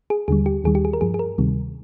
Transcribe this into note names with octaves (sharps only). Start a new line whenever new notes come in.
G#4
D#2 D3 G3 G#4
G4
D#2 D#3 G3 G#4
G4
G#4
A#4
G2 F3 G#4
G#4
A#4
D2 C3 D#3 G3